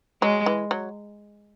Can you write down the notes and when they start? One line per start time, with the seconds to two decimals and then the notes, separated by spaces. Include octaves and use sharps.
0.22 F#3 G#3
0.46 E3
0.71 F#3